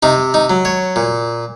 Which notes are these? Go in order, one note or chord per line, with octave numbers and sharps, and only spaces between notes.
C3 D#4
D#4
F#3
C#5
A#2